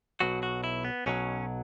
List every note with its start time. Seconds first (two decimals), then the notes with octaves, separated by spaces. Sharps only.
0.20 B1 B2 F#3 F#4
0.43 F#4
0.64 E4
0.84 B3
1.06 B1 B2 F#3 C#4